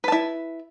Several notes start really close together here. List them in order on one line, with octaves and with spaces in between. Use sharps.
B4 A5 E4